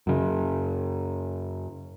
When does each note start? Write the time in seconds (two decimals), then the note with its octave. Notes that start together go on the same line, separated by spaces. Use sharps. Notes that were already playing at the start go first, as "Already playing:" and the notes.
0.07 F#2 C#3